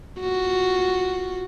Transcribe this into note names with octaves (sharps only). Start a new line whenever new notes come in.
F4 F#4